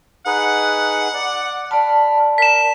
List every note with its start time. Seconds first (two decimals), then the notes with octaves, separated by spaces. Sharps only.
0.26 D#4 G#4 B4 F#5
1.14 D5
1.71 D5 A5 B5 F6
2.38 A#4 B6 E7